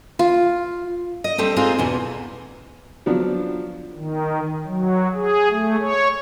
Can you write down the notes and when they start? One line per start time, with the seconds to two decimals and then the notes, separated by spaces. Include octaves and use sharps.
0.19 F4
1.24 D#5
1.38 G3 A3 C4
1.56 G#3 C4 D#4 F4 G#4
1.79 E2 B2 E3
3.06 F3 F#3 B3 D4
3.95 D#3
4.66 F#3
5.14 G#4
5.49 A3
5.80 C#5